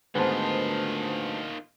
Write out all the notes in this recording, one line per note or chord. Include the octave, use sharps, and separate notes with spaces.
D2 G#2 D#3 B3 F4 B4 C5 A5